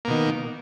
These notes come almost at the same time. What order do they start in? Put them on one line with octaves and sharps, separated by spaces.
A#3 B2 D#3